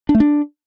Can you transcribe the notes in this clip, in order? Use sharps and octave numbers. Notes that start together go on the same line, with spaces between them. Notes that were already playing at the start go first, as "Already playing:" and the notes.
D4
A3
D4